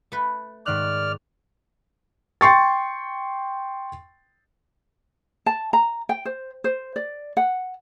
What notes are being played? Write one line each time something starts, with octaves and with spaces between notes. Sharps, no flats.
A3 B4
G#2 D#3 D5 F6 F#6
G5 C6 C#6 A6
A5
A#5
G5
C5
C5
D5
F#5